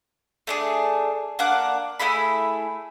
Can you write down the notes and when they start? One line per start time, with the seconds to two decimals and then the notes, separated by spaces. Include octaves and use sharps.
0.47 A3 D4 G#4
1.39 A#3 D4 F#5 D6
1.99 A3 E4 G#4 B5